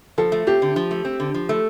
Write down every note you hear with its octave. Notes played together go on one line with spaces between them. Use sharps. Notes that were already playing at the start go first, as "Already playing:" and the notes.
F3 A4
A3
C4 G4
D3
F3
A3
C4
D3
F3
A3